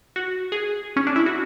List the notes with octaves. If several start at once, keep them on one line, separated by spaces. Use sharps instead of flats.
F#4
G#4
C#4
D4
E4
F#4